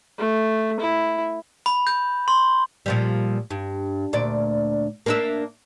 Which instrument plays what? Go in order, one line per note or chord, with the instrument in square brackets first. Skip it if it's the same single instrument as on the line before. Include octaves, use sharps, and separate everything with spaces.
[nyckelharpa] A3
E4
[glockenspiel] B5
G6
C6
[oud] A#2 F3 G3
G2
D2 A#2 D5
A#3 D4 E5